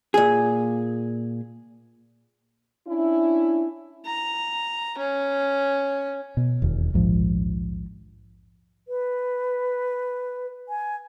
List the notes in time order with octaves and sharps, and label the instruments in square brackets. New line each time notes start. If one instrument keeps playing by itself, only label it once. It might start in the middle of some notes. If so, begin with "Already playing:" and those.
[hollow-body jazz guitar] A#2 G#4
[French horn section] C#4 D4 E4
[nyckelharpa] A#5
C#4
[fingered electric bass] B2
E1 D#2
A#1 D#2 G#2 F3
[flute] B4
G#5